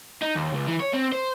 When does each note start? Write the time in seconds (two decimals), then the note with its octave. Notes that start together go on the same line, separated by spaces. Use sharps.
0.23 D#4
0.37 D#2
0.54 C#2
0.67 E3
0.80 C#5
0.93 C4
1.12 C5